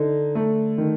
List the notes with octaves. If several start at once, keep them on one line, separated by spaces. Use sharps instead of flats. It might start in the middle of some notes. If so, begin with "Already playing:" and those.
Already playing: D3 D#4
A3
D#3